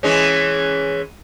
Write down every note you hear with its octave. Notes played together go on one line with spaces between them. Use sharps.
E3 G#3 C#4